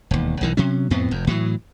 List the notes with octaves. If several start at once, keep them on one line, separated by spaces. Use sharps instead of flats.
E1 D#2
B1 D#3 E3
C3 F#3 C#4
F2 A2 B3 C4
F1 F2
A2 E3 F#3